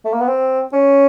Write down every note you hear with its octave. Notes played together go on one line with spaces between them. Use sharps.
A3
A#3
B3
C4
C#4